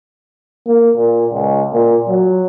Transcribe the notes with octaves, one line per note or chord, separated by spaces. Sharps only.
A#3
A#2
C#2
A#2
F#3